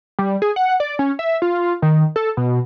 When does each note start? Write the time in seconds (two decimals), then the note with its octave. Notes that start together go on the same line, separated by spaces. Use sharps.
0.19 G3
0.42 G#4
0.56 F#5
0.80 D5
0.99 C#4
1.19 E5
1.42 F4
1.82 D#3
2.16 A4
2.37 B2